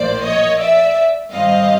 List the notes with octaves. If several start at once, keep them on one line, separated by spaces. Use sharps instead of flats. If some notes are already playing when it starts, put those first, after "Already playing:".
Already playing: A#1 A2 F3 A#3 C5 D5
C#5 D#5
D5 E5
G#2 D#3 G3 C4 D#5 F5